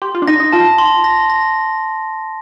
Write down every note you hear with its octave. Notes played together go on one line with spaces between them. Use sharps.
G4 C6
F4
D4
D#4 A#6
D#4
F4 A5
C6
A#6
A#6